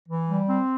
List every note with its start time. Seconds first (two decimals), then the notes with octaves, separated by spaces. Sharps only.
0.09 E3
0.29 G3
0.48 C4